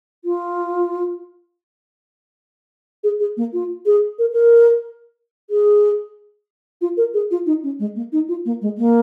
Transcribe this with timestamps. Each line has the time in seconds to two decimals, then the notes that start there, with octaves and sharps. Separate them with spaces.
0.25 F4
3.04 G#4
3.20 G#4
3.37 A#3
3.53 F4
3.86 G#4
4.19 A#4
4.33 A#4
5.50 G#4
6.81 F4
6.97 A#4
7.14 G#4
7.31 F4
7.46 D#4
7.63 C#4
7.79 G#3
7.96 A#3
8.12 D#4
8.29 F4
8.45 A#3
8.62 G#3
8.78 A#3